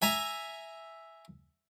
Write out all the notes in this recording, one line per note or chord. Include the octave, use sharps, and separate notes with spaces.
E5 G#5 A#5